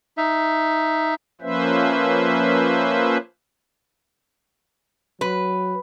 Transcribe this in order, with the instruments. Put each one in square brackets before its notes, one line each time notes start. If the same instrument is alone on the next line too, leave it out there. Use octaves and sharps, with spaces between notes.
[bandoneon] D#4 E5
[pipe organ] F3 A#3 C#4 B4 C5 E5
[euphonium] F#3 [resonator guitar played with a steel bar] B4